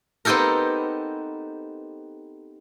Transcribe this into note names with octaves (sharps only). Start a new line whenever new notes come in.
B3 C4 D#4 G4 A4 A#4